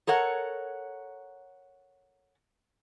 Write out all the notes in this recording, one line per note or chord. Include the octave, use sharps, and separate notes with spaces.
A4 A#4 C#5 F#5